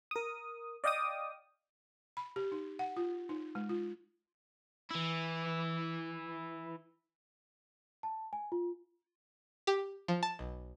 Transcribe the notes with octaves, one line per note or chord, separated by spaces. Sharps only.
A#4 D#6
D5 D#5 F5 G5 D6 D#6
B5
G4
D#4
F#5
F4
D#4
G#3
F4
E3 E4
A5
G#5
F4
G4
F3
A5
B1